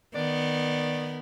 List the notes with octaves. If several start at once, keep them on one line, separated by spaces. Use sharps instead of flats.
D#3 B3 D5